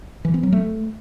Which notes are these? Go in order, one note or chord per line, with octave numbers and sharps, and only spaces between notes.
E3
C4
F#3
A3